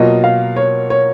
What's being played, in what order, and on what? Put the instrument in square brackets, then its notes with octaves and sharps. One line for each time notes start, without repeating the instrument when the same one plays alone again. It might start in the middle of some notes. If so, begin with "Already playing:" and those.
Already playing: [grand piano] B2 F#3 A#3 F4 [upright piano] D#5
[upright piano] F5
C#5
C#5